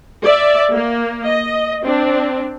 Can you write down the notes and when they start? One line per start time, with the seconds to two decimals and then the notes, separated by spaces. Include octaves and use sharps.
0.24 D5 E5
0.72 A#3
1.25 D#5
1.83 C4 D4